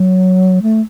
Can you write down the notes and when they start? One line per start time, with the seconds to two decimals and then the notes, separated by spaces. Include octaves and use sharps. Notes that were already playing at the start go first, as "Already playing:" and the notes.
Already playing: F#3
0.62 A3